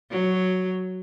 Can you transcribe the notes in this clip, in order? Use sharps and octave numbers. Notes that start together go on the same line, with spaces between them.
F#3